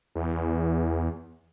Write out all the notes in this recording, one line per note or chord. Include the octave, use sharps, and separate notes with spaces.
E2